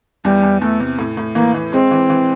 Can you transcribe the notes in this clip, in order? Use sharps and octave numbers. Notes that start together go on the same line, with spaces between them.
E2 G3
E2
E2 A3
C3
A2
A2
E3 A#3
E3
G#3 C4
E3
E3